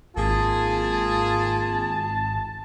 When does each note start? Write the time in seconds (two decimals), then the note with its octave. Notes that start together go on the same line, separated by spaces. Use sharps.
0.16 G#1 A#3 F4 G#4 A5